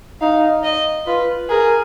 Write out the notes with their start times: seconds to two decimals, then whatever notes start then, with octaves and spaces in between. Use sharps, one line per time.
0.21 D#4 F5
0.64 D#5
1.07 F4 B4
1.50 G#4 A#4